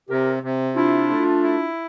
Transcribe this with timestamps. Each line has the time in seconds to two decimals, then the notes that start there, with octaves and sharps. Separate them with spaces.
0.09 C3 G4 A#4
0.43 C3
0.76 D4 E4 F4
1.09 A3
1.43 E4